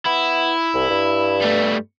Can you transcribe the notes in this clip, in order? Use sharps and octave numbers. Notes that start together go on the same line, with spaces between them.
B3 E4
C2
G2
G3 A3